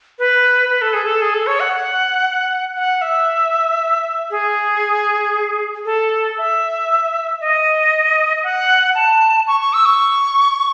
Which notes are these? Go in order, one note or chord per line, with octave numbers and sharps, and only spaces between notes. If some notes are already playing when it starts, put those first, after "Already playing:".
B4
B4
A4
G#4
A4
G#4
A4
C#5
F#5
F#5
F#5
E5
G#4
A4
E5
D#5
F#5
A5
C#6
C#6
E6
C#6